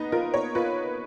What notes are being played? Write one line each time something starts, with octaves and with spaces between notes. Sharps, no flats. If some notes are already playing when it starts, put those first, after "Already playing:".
Already playing: B3 D#4
F4 A#4
C#5
F4 B4